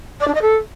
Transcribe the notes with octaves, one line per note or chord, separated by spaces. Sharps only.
D5
D4
D#5
A4